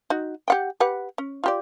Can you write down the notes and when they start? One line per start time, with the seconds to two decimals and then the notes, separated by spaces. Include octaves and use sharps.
0.10 D#4 F#4
0.48 G4 F#5 G5
0.80 G4 B4 F#5
1.18 C#4
1.44 F4 G4 D5